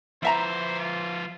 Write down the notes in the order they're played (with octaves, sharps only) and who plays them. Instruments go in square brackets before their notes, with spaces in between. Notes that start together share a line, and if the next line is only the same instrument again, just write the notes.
[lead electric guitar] F3 B4 [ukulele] E4 E5 A#5 [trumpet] C5
[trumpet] F4